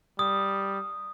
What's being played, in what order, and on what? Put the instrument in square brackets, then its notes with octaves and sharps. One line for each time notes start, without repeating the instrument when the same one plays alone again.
[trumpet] G3 [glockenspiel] D#6